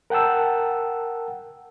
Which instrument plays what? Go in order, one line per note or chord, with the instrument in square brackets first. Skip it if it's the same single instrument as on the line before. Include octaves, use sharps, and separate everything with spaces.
[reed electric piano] A#4 F#5 G5 A5 E6